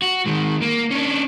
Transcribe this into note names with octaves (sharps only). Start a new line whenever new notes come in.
F#4
D#3 G#3
A#3
C#4 D4